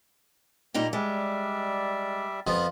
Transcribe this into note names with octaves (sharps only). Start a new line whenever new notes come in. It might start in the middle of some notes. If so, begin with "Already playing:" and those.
A#2 G3 A#3 D#4
G3 G#3 D5 E5
F2 F3 B3